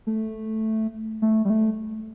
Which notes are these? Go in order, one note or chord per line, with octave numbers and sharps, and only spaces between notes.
A3
A3
G3
A3